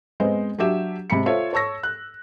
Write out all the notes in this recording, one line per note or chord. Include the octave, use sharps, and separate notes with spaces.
G#3 B3 C4 C5 D#5
F#3 D4 G4 E5 E7
C3 G#3 B5 C#7
F4 A4 C5 C#5 E5
C#5 A5 C#6 E6 A#6
F#6